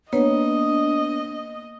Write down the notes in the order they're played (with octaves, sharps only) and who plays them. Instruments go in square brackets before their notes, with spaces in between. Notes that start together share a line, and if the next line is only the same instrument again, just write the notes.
[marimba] A#3 B4 C#5 [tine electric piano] B3 [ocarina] D4 [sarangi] D#5